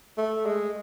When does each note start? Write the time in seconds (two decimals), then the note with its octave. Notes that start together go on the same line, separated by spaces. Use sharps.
0.18 A3
0.46 G#3